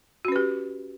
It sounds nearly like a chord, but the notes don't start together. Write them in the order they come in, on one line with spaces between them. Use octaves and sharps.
F#4 C#4 B4 G4